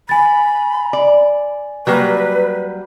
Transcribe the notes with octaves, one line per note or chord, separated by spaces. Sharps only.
G#5 B5 A6
D5
F#3 G3 A#3 B4